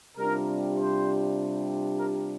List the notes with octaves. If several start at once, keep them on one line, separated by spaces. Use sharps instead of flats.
C3 G3 D4 F4 A#4
C5
A#4